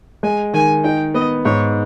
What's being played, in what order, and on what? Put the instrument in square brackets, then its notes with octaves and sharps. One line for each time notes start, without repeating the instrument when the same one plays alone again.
[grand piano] G#3 [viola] G#5
[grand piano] D#3 [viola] G#5
[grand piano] D#4 [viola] G5
[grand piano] B3 [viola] D#5
[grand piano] G#2 [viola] C#5